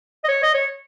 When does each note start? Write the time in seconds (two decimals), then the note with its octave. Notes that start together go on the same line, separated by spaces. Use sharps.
0.24 D#5
0.29 C#5
0.43 D#5
0.54 C#5